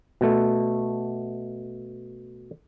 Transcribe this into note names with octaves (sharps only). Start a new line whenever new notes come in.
B2 A3